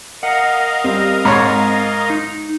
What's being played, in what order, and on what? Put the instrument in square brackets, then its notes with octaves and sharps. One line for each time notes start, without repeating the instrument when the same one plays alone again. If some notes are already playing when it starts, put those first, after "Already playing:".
[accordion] A#4 D#5 F5 [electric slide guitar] F#5
[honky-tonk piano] G3 [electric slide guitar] C4
[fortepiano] G#2 C#5 [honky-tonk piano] A#5
[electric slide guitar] D#4